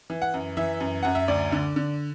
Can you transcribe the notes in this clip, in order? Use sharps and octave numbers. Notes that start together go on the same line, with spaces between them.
E3
F#5
F#2
E3 E5
F#2
F#2 F#5
E5
D2 D5
D3
D3